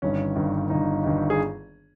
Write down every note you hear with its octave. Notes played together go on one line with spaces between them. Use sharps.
G1 G2 D#3 C#4
G1 G2 D#3
G1 G2 D#3 D#4
G1 G2 D#3
G#4